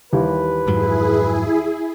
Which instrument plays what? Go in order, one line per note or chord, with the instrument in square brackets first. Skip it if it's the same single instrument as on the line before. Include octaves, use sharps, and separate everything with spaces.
[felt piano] D#2 E3 G3 [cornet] B4
[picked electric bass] F2 G#2 F#3 [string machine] E4 G#4